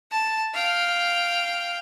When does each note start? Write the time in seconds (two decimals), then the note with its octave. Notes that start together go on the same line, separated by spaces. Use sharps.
0.12 A5
0.54 F5 G5